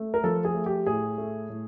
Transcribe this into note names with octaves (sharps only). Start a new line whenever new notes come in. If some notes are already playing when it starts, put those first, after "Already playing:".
Already playing: A3
A#4
F3 A4
G#4
A3
G4
A2 G#4
A3
A2